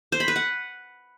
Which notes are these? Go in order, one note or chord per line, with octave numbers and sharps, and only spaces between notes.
C5
B5
B4
F#5